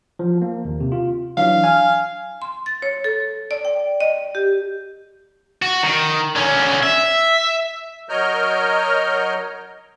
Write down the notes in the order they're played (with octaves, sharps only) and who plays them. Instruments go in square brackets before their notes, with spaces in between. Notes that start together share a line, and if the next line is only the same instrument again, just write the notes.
[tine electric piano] F3
A#3
D#2
C3
F4
[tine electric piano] E3 F#3 D4 [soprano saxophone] F5
[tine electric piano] G#5 F6
[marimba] C6
A6
C#5
A4
D5
G5
D#5
G4
[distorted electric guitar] F#4
D#3
D3 C#4
E5
[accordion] F#3 A#4 C#5 D#5 F6 G6